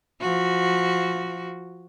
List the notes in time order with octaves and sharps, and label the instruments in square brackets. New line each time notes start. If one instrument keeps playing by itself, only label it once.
[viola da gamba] F3 F#4